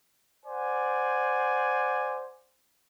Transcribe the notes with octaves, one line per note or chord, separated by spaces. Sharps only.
C5 D5 F#5 G#5